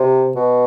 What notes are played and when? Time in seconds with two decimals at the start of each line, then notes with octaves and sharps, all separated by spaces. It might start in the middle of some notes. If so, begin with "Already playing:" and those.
Already playing: C3
0.35 B2